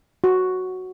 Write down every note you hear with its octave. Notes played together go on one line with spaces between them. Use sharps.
F#4